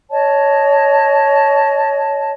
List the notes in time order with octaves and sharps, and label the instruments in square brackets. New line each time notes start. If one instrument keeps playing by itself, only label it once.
[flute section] C#5 D#5 A5